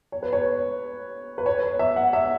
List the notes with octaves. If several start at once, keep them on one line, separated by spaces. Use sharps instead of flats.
C#5
B4
C#5
B4
C#5
C#5
E5
F#5
E5